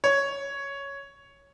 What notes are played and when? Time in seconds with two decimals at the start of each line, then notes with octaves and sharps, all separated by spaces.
0.04 C#5